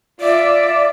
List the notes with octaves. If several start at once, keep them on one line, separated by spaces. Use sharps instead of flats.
F4 D5 E5